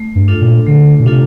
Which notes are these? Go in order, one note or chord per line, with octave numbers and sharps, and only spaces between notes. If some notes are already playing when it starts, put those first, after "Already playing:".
Already playing: A3
G2
D4 F4 A4
A#2
D3 A3
A#2
C3 D4 F4 A4